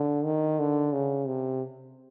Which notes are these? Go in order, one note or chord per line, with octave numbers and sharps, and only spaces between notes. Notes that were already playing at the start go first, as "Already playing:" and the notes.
Already playing: D3
D#3
D3
C#3
C3